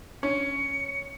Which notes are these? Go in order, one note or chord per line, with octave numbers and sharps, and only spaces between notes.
C#4 C#7